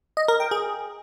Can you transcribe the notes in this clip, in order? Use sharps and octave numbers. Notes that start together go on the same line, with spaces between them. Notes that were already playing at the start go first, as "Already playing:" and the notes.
D#5
A#4
G5
G#4